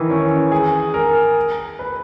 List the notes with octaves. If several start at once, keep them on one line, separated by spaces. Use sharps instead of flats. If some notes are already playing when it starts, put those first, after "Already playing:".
Already playing: D#3 E3
C#4
G#4
A#4
B4